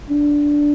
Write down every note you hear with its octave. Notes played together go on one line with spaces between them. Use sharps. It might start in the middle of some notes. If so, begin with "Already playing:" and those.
D4